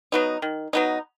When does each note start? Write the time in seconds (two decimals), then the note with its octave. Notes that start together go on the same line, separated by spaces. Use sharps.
0.12 F#3 B3 D#4
0.42 D#3
0.73 F#3 B3 D#4